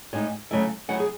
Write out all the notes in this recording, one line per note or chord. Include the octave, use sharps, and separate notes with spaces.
A2 G#3 D#4 C#5
C#3 F#3 A3 E4 E5
C#3 F#3 A3 E4 F#5
G#4